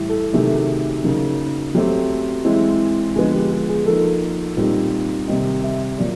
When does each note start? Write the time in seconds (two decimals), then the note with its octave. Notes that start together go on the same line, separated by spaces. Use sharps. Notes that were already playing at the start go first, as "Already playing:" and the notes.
Already playing: A2 E3 G3
0.09 A4
0.33 C3 D#3 F#3 A3 G#4
1.03 C#3 F#3 A#3 D#4
1.75 F#3 A3 C4 G4
2.45 E3 G#3 C4 E4
3.15 D3 F3 G#3 B3 G#4
3.34 G4
3.51 G#4
3.69 G#4
3.86 F3 A#3 D#4 A4
4.57 A#2 G3 C4 D#4
5.28 C3 D#3 G3 C4 D#4 D#5
5.64 E5
5.98 A#2 F#3 D5